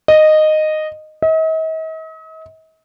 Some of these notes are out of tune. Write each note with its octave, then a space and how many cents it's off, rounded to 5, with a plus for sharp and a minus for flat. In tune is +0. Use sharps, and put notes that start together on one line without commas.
D#5 -10
D#5 +45